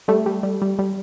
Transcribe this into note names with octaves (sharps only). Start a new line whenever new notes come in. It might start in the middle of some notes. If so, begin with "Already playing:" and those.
G3 A3
G3
G3
G3
G3